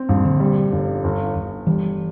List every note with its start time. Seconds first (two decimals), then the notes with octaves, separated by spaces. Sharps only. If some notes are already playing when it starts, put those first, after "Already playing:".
Already playing: C4
0.09 A#1 G2
0.25 D3
0.40 G3
0.72 G1
1.04 G1
1.35 G1
1.67 E3 G3